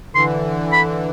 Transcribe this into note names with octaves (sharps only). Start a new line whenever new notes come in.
D3 E3 C6
B5